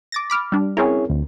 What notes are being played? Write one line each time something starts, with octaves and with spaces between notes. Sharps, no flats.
D6 A6 A#6
B5 D6 F6
G3 D4
C4 C#4 E4 G#4 A#4 C#5
D2